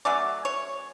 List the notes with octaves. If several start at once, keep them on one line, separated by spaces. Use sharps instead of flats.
F#3 A3 C#4 D5
C#5